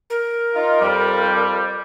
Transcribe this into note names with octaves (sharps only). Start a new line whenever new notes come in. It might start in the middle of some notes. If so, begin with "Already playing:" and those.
A#4
D#4 F4
F2 G3